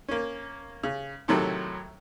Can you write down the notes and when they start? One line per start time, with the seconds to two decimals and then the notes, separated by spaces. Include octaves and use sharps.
0.08 A#3 C#4
0.84 C#3
1.28 A2 C3 D#3 F#3 A4